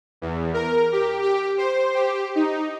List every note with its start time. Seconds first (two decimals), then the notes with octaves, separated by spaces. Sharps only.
0.22 E2
0.54 A#4
0.92 G4
1.22 G4
1.58 C5
1.95 G4
2.35 D#4